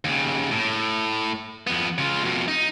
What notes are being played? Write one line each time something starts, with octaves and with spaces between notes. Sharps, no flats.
D#2 C#3
A2
F2 B3
C#3 F4
F2 B2
D#4